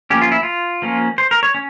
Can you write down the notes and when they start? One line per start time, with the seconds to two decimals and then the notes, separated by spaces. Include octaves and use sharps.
0.10 F3 A#3 C#4 G4
0.22 F4
0.31 E4
0.43 F4
0.82 F3 A#3 C#4
1.18 C5
1.31 A#4
1.43 C#5
1.55 C#4